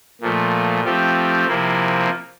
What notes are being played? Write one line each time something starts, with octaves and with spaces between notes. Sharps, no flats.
A#2 F3 A3
F3 A3 C4 G4
C3 F3 A#3 E4